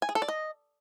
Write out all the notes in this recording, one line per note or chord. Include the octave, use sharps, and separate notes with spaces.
G#5
G#4
A4
D5
D#5